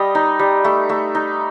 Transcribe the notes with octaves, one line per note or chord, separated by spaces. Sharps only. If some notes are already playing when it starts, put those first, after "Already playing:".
Already playing: G3 D#5
D#4
G3
A3
A3
D#4